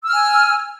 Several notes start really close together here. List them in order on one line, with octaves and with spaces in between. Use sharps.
E6 F6 G#5